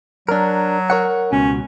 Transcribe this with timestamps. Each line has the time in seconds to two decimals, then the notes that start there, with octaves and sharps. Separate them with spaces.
0.29 F#3 D4 A#4
0.90 A#4 C#5 F#5
1.32 C#2 B2 C#4